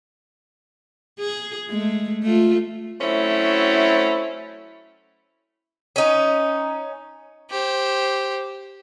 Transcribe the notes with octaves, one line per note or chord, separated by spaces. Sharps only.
G#4
G#3 A3
A3 F4
F#3 A3 C4 C#4 E4
C#4 D#4
G4 C5